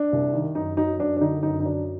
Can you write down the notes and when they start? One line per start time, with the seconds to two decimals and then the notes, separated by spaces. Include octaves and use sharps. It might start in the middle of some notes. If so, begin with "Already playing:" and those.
Already playing: D4
0.12 C2
0.34 D#3
0.55 F#2 D#4
0.77 F#3 D#4
0.99 F#2 D4
1.17 D4
1.21 D3 D#4
1.43 F#2 D#4
1.60 D#4
1.65 F#3 D4